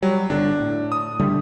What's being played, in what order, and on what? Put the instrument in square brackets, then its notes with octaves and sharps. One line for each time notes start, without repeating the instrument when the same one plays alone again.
[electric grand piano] F#3 [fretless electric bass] G3
[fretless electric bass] G1 D3 [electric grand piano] D4
[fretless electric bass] A2
[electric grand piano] D#6
[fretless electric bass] D3 G3 A3